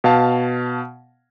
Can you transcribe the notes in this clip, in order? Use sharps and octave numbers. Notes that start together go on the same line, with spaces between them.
B2 F5 A5